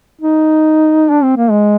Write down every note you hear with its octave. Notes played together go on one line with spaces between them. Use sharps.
D#4
D4
C4
A#3
G#3